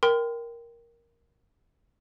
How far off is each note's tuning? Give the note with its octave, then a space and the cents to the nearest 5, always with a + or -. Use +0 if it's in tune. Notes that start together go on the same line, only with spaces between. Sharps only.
A#4 +5 G5 +0 C6 -35